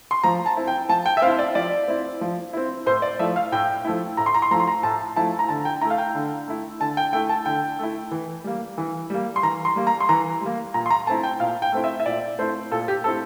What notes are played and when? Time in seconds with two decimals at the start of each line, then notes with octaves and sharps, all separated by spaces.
0.11 C6
0.24 F3 A#5
0.46 A5
0.57 C4 E4
0.68 G5
0.89 F3 A5
1.06 G5
1.17 E5
1.22 C4 F5
1.26 E4
1.39 D5
1.55 F3 D5
1.88 C4 E4
2.21 F3
2.53 C4 E4
2.86 A2 C5
3.02 D5
3.19 F3 A3 E4 E5
3.36 F5
3.52 A2 G5
3.85 F3 A3 E4
4.17 A2 A#5
4.26 C6
4.35 A#5
4.42 C6
4.51 F3 A3 E4 A#5
4.60 C6
4.67 A#5
4.83 A2 A5
5.16 F3 A3 E4 A5
5.39 A#5
5.49 D3 A5
5.65 G5
5.81 A3 E4 A#5
5.90 F5
5.98 G5
6.14 D3
6.48 A3 E4
6.80 D3 A5
6.97 G5
7.13 A3 E4 G5
7.29 A5
7.46 D3 G5
7.79 A3 E4
8.11 E3
8.44 G3 A#3
8.78 E3
9.10 G3 A#3
9.36 C6
9.43 E3 A#5
9.65 C6
9.76 G3 A#3
9.87 A#5
10.00 C6
10.09 E3 A#5
10.41 G3 A#3
10.74 A#2 A#5
10.86 C6
10.91 A#5
11.07 A3 C4 E4 A5
11.23 G5
11.40 A#2 F5
11.62 G5
11.72 A3 C4 E4
11.84 E5
12.00 E5
12.05 A#2 D5
12.39 A3 C4 E4 C5
12.71 A#2 A4
12.88 G4
13.04 A3 C4 E4 A4